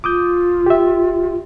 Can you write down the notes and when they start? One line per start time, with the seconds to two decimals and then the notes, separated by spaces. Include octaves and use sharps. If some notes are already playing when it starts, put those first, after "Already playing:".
0.04 F4 D6 D#6 G6
0.66 G4 E5